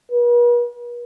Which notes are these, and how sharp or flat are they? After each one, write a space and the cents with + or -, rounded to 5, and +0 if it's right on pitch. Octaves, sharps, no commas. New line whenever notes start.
B4 -45